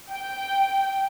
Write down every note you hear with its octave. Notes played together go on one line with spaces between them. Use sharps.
G5